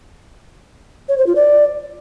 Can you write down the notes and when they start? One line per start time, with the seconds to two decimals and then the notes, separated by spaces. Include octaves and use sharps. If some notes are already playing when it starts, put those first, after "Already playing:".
1.09 C#5
1.18 C5
1.27 F4
1.36 D5